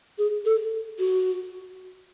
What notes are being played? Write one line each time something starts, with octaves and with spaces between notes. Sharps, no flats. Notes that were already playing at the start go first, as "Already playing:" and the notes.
G#4
A4
F#4